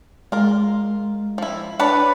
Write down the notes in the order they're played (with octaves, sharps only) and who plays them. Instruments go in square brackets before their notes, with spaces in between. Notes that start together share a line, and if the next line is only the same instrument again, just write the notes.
[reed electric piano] G#3 [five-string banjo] F4 A#4
[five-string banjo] F3 E4
[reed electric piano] D4 [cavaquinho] B4 B5 [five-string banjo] C#5 D5 A5